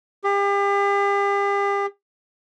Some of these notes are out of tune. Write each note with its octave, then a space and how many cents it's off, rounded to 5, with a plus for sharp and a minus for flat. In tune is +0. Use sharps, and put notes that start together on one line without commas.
G4 +40